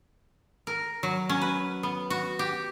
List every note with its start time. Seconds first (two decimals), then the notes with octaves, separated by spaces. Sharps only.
0.67 A#4
1.03 F#3
1.29 C#4
1.41 B4
1.83 B3
2.10 F#4
2.39 G4